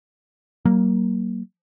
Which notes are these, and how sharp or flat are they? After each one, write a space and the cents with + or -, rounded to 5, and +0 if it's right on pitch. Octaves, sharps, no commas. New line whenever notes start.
F#3 +40 A#3 +0